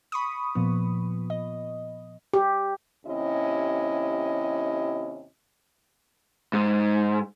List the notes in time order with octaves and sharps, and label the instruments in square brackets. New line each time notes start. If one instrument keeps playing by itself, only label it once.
[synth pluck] B5 C#6 D#6
A#2 F3 B3
D#5
[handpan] G4
[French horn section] D#2 C3 C#4 E4 D#5
[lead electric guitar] G#2